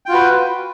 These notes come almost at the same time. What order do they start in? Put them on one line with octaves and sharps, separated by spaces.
G5 F4 F#4 B4